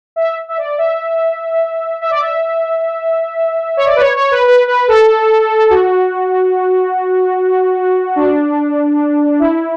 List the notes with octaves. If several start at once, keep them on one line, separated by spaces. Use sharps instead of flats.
E5
E5
D5
E5
E5
D5
E5
C#5
D5
B4
C#5
C#5
B4
B4
B4
A4
F#4
D4
E4